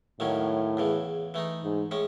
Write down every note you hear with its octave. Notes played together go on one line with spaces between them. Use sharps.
D#2 A2 D#3 F#3 C#4
E2 C#3 E3
E3 A3 D#4
G#2
A2 G#3 C#4